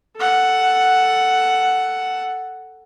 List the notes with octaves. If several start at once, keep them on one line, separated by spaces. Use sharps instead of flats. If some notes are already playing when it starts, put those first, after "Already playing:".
A4 F#5